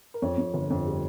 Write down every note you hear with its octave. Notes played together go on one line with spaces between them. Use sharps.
A#4
F2 C#5
F2
G1
F2
G3